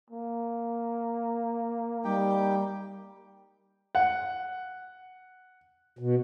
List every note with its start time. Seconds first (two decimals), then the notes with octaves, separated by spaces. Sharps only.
0.10 A#3
2.04 G3 D#4 G4 G5
3.95 F#5
5.99 B2